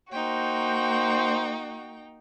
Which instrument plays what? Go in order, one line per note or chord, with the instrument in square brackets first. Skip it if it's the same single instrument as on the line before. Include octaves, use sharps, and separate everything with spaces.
[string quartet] A#3 D#4 G5 [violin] F#4 [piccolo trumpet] C5